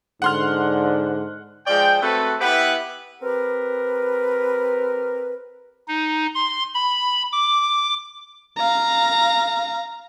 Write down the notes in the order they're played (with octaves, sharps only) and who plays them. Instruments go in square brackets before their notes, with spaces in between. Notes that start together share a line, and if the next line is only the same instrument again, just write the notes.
[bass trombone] G#2 [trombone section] D3 [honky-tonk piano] F#5 C6 F6
[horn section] F3 G#3 D5 G5
A3 C4 F#4 A4 B4
B3 E4 G4 B4
[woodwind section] C4 G4 A#4 B4
[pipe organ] D#4
C6
B5
D6
[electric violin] F5 A#5